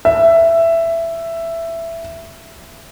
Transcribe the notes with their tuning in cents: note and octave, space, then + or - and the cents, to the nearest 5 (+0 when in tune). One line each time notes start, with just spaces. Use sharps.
E5 +10